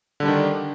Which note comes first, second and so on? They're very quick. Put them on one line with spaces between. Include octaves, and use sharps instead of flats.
D3 G3 D4 D#3